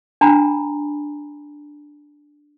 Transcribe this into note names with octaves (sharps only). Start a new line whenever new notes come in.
D4 G#5 A#5 B5